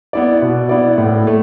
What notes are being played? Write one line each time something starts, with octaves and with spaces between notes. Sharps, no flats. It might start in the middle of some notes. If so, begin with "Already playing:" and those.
B3 E4 D5
B2
B3 E4 D5
A2
A3